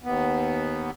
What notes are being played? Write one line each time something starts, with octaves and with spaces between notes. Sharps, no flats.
D#2 B3